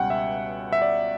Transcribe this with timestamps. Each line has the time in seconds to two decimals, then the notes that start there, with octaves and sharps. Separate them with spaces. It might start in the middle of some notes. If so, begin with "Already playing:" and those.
Already playing: C#2 B2 G3 C#4 F#5 G5
0.10 E5
0.73 E5
0.82 D5